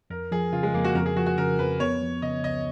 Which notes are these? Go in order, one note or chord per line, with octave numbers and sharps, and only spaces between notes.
F2 A#4
F3 G#4
C#3 F4
G#3
F2 A#3
F#4
F2 A#4
G#4
F3 F#4
F#4
C#3 A#4
F2 B4
B3 C#5
F3
C#3 D#5
C#2 D#5